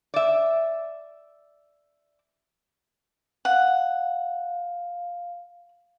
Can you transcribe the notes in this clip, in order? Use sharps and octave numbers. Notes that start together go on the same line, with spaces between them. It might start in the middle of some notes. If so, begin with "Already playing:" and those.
D5 E5
F5 F#5